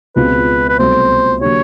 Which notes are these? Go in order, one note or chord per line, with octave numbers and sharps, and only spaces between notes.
C#2 B2 G#3 C4 F4 B4
B4
C2 B2 F#3 A3 C5
D3 F#3 A#3 D4 G4 C#5